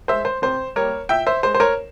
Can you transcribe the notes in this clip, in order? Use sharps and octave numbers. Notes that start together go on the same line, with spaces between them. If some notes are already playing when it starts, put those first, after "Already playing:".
G#3 C5 E5
C5
C3 C5
G3 A#3 A#4 C#5
A#2 E5 G5
C5 E5
G#3 C5
C5
A#4 C#5